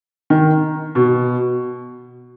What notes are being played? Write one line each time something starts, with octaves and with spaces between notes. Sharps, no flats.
D#3
B2